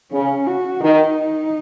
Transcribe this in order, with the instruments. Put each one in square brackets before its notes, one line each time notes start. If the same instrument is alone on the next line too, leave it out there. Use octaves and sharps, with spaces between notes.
[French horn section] C#3 [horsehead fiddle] C#4
[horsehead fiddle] F#4
[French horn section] D#3 [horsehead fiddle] D#4